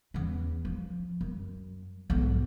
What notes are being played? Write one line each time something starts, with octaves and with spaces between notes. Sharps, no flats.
E2 C#4
F3
F#2
B1 G#2